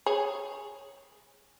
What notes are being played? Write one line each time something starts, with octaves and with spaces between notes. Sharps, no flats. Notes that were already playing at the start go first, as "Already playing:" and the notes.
G#4 C#5